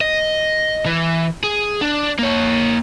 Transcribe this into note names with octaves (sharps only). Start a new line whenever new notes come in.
D#5
E3
G#4
D4
A#3 C#5